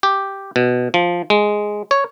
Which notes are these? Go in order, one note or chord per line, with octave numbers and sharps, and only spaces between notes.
G4
B2
F3
G#3
C#5